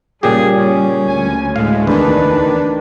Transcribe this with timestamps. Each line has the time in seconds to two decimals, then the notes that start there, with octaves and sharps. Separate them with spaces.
0.23 A#2 C#3 G3 G4 G#4
0.56 C#4
1.07 D2 G#5
1.56 A2 G#3 F5
1.87 E2 D#3 D4 G#4 B4